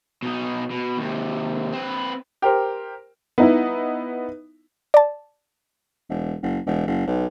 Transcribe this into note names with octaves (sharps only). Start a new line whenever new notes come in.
B2 D#4
B2
D#2 C3
C4 B4
G4 A#4 C5
B3 D#4 E4
D5 A5
E1
F#1
E1
F#1
B1